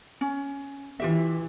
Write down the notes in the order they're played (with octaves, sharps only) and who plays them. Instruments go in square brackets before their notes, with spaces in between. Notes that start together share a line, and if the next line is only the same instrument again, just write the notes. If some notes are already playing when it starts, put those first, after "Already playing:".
[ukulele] C#4
[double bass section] E3 [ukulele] F4 G4 E5